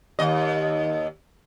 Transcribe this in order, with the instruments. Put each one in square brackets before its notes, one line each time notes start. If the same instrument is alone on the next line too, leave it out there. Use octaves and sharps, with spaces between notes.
[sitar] D#2 D#5